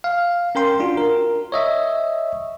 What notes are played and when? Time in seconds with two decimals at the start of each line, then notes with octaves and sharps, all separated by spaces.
0.04 F5
0.55 C#4 A#4 G5 C6
0.80 D4 F4 F#4
0.97 A#4
1.52 C#5 D#5 E5